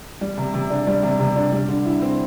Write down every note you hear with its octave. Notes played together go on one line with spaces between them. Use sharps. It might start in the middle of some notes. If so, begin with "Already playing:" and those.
G3
C3
C3
D4
G3
C3
C3
D4
G3
D3
E4
C4